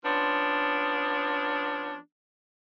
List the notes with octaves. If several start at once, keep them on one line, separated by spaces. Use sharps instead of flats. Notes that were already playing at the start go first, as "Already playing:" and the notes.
F3 B3 C#4 D4